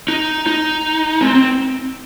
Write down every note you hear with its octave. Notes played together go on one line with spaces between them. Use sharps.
D#4
D#4
C4
C4